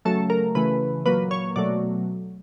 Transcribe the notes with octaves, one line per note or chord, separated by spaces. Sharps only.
C#3 F#3 A3 A4
A#4
C#3 E3 A3 B4
A#2 F#3 A#3 B4
C#5
B2 F#3 A3 D5